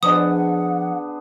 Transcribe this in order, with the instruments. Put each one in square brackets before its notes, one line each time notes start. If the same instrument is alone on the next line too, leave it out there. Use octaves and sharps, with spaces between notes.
[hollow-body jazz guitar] F3 C5 D#5 [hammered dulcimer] B3 D4 G#4 [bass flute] F#5 [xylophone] D#6